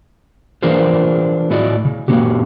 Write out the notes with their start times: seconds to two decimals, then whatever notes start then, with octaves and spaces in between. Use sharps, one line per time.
0.62 E3 D4 F4 G#4 A#4 C5
1.50 A2 E4 F#4 D5 D#5
1.85 C#3
2.08 A#2 C#3 A#3 C#4 F#4 G4